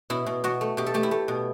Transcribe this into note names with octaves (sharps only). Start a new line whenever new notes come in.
B2 E4
B2
B2 F#4
A3
B2 G4
A4
A3 G4
E4
A3
B2